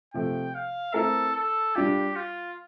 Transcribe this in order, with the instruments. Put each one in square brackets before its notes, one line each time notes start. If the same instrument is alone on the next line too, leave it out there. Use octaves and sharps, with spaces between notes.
[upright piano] C3 F3 A3 [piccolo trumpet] G5
[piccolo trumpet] F5
[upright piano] A3 C4 E4 A#4 [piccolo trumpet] A4
[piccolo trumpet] A4
[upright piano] G3 D4 F4 [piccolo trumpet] G4
[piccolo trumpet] F4